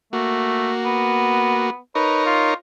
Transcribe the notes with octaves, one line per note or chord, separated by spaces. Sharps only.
A3 A#3 F#4
B3
D#4 A#4 B4 C#5
F4